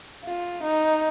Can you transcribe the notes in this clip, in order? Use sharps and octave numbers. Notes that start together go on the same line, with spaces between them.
F4
D#4